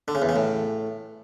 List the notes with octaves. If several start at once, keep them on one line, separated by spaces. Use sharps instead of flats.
D3
C#3
E2
C#3
A2